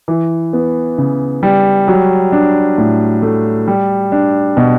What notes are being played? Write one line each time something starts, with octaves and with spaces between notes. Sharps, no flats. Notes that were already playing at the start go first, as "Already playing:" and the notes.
E3
B3
C#3
G3
F#3
D4
A2
A3
G3
D4
B2